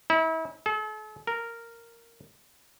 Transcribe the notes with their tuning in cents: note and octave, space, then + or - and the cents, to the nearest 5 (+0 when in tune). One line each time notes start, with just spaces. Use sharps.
E4 -35
A4 -40
A#4 -10